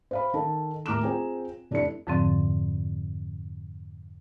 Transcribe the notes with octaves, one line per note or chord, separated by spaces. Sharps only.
C5 F5 B5
D#3 A4 A5
D#2 A2 A#5 D6 F6 E7
C4 F4 G#4 G5 G#5 A#5
F1 D4 E4 A4 D5 C#7
F2 G#2 D3 F3 C4